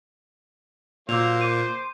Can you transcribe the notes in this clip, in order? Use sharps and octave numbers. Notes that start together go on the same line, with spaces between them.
A#2 F#3 A#3 C5 F5 D6 E6 F7
D6 D#7